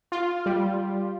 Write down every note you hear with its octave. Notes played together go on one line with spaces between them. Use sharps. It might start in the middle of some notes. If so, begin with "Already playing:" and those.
F4
G3